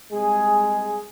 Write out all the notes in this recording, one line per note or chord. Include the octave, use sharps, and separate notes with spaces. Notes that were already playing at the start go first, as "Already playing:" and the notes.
C2 G#3 G#4